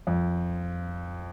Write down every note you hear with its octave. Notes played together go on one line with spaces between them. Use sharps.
F2